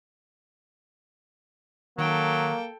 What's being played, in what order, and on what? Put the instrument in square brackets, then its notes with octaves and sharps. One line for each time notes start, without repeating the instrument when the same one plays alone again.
[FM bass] D#3 [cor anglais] F#3 [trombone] A#3 [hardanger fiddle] A4 G5